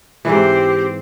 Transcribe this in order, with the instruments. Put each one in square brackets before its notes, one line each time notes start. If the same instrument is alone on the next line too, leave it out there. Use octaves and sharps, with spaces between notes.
[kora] G#2 E3 [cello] C4 [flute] G4